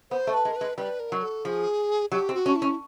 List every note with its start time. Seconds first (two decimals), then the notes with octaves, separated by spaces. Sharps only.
0.11 B3 C5
0.27 A3
0.34 B4
0.45 G#3
0.51 A#4
0.56 G#3 B4
0.78 G3 B4
1.00 A#4
1.12 F#3
1.23 A4
1.45 F3 G#4
2.12 F#3 G4
2.29 C4
2.34 F#4
2.46 C#4
2.56 E4
2.62 C#4